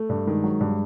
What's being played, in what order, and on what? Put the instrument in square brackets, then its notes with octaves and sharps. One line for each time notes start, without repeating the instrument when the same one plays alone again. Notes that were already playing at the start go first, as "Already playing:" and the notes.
Already playing: [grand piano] A3
G2
[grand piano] D#3 [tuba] G#3
[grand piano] F#3
G2